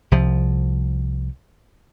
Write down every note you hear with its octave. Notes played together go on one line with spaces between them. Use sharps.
C2 F3